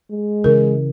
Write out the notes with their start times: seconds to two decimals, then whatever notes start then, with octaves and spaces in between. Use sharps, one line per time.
0.11 G#3
0.44 C#3 E3 A#4